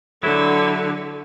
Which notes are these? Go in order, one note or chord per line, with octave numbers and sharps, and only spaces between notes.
D3 F#3 E4 A4